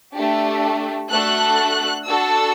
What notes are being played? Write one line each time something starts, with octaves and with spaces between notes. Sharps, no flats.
A3 D4 G4
A3 D4 F#4 A4 F#6
D4 F#4 A4 E6